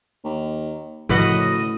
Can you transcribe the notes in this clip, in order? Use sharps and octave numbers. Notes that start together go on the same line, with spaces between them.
D#2
F#2 A2 C#3 F3 B4 D#5 F#5